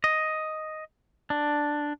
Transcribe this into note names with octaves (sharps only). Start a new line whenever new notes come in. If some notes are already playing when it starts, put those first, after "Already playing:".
D#5
D4